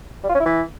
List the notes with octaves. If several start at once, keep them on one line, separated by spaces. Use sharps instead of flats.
G3
F4
C#4
E4
E3